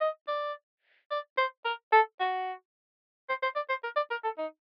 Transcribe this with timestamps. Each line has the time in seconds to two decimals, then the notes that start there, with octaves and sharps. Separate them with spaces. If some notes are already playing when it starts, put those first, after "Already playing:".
0.01 D#5
0.28 D5
1.11 D5
1.38 C5
1.65 A#4
1.92 A4
2.20 F#4
3.29 C5
3.43 C5
3.56 D5
3.69 C5
3.83 A#4
3.96 D5
4.11 A#4
4.24 A4
4.38 D#4